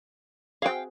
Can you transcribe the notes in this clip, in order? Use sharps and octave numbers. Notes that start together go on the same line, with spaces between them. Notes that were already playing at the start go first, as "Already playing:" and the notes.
C4 F#4 G#4 F5 G5